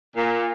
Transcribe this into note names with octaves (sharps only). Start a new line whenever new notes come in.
A#2